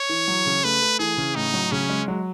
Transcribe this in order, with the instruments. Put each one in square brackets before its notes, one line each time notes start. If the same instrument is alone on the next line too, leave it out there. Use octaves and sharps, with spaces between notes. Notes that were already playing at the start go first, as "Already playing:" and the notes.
Already playing: [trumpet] C#5
[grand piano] E3
F#3
C#3
[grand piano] A3 [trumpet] B4
[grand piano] A3
[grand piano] E3 [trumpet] G#4
[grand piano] C#3
[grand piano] A2 [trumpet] D#4
[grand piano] F#3
[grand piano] C#3 [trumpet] C#4
[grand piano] G#3
F#3